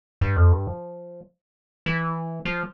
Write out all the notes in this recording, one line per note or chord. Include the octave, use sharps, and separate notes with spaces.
G2
F2
G2
F3
E3
F3